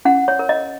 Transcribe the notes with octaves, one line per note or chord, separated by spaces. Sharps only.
C#4 F#5
C#5
A#4
D#5